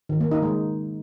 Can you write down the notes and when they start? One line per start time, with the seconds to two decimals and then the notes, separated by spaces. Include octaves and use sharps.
0.09 D#3
0.20 A#3
0.31 D#4
0.42 G#3